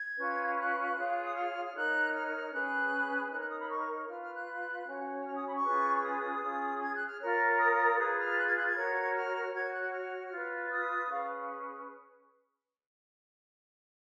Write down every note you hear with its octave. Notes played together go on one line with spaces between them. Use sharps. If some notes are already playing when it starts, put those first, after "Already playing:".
Already playing: G#6
C#4 F4 B4
F#6
F4 G#4 C#5
D#6
F6
F6
D#4 A#4 C#5 F#6
F6
C#4 G#4 B4 F#6
D#4 A#4 C#5 F#6
F#6
D#6
B5
C#6
F4 B4 F6
F6
F#6
C#4 F#4 C#5
F6
D#6
B5
C#6
C#4 F4 G#4 B4
D#6
C#4 F4 G#4
G#6
F#6
F6
F4 A#4 C#5 F6
D#6
F4 G#4 B4 D#6
F6
F#6
G#6
F#6
G#6
F#4 A#4 C#5
F6
F#4 C#5 G#6
F#6
F6
F4 B4
D#6
C#4 G#4 B4 F5